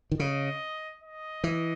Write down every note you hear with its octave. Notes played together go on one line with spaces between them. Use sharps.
D#3
C#3 D#5
D#5
E3